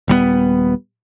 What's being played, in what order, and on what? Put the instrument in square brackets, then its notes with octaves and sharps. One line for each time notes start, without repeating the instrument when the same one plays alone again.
[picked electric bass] D#1 G3 G#3 B3